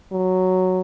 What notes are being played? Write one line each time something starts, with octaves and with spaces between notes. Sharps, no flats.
F#3